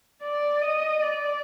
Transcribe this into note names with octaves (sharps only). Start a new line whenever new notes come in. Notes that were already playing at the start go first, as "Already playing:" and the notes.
D5
D#5
D5